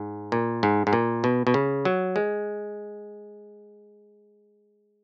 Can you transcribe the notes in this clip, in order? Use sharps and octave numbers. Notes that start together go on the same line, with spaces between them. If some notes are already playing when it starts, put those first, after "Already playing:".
Already playing: G#2
A#2
G#2
G#2
A#2
B2
B2
C#3
F#3
G#3